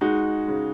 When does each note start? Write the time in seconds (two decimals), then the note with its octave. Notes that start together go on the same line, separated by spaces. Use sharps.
0.01 G#3 D#4 F#4
0.48 C#3